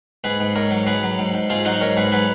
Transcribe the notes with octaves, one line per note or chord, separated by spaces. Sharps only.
G#2 G#4 B4
G#2
G#2 A#4 C#5
F#3
F#3 G#4 B4
F#3
G#2
G#2
G#2 F4 G#4
F#3 D#4 F#4
G#2 A#4 C#5
G#2 G#4 B4
F#3 G#4 B4